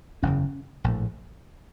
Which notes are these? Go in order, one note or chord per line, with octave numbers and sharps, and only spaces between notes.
F#1 E2 C#3 C#4
A#1 A2